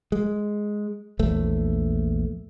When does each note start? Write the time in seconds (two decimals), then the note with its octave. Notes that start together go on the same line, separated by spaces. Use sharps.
0.12 G#3
1.19 A#1 E2 A3